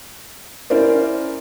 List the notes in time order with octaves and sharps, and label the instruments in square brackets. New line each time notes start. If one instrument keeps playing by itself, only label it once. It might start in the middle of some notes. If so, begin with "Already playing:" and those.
[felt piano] C#4 E4 A#4 C5 D5